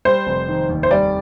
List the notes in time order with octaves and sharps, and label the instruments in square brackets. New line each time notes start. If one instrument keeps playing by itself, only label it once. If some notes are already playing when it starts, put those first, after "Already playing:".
[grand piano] G3 [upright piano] C5
[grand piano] F1
D#3
D#2
[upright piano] C5
[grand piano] G3 [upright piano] D5